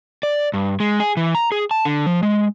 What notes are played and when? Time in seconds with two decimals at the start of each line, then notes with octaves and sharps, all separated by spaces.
0.23 D5
0.54 G2
0.80 G#3
1.00 G#4
1.17 E3
1.35 A#5
1.52 G#4
1.71 A5
1.85 D3
2.06 F3
2.23 G#3